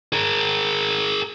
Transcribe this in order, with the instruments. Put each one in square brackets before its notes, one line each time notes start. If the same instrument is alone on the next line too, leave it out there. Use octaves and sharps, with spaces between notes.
[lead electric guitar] G#4 A#4